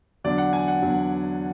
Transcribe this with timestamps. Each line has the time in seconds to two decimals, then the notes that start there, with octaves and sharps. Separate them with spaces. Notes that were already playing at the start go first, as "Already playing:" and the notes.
0.24 E2 D3 F#3 D5
0.38 F#5
0.53 G#5
0.68 F#5
0.82 E2 D3 F#3